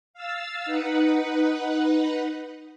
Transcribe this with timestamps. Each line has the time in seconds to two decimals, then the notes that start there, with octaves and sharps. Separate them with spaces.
0.14 F5 E6 A6
0.65 D#4 B4 F#5